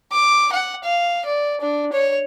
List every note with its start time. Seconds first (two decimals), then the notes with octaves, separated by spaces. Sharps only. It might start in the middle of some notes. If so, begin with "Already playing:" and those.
0.12 D6
0.52 F#5
0.84 F5
1.25 D5
1.61 D4
1.93 C#5